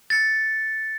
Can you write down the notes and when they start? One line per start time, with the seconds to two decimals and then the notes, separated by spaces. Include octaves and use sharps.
0.10 A6 C#7